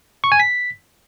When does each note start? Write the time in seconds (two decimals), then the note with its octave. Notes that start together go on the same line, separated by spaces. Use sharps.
0.24 C#6
0.32 G#5
0.40 B6